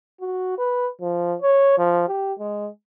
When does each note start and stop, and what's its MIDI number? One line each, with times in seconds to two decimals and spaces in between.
0.21 0.58 66
0.58 0.88 71
1.01 1.35 53
1.42 1.75 73
1.78 2.07 53
2.08 2.33 67
2.39 2.68 56